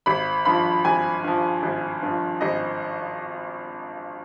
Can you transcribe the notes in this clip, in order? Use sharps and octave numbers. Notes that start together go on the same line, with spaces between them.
G#1 B5
G2 F3 B5
G#1 G#5
G2 F3
G#1
G2 F3
G#1 D#5